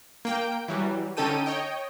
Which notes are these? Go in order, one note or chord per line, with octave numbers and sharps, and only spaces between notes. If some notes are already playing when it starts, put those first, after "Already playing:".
A#3 G5
E3 F#3 G3
D3 C#4 D#4 A4 G5 D#7
C#5 D#5 G5